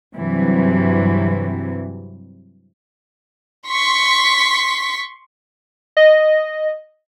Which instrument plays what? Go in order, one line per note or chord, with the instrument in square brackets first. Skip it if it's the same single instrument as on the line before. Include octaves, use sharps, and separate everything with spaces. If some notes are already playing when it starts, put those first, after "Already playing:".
[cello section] G2 C3 E3 F#3
[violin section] C6 C#6 B6
[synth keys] D#5